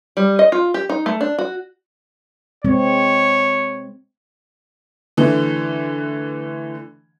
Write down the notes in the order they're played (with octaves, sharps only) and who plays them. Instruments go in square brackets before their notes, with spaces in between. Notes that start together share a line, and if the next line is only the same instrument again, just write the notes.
[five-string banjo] G3
D#5
F4
G4
D#4
A3
D4
F#4
[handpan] G#3 C4 [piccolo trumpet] C#5
[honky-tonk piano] D3 E3 A3